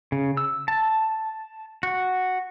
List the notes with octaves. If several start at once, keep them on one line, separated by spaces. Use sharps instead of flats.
C#3
E6
A5
F#4